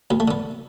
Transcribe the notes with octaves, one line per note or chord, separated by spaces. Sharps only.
D2 B3
A3
D3 B3